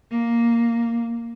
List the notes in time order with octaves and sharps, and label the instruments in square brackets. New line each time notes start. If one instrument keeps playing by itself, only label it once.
[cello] A#3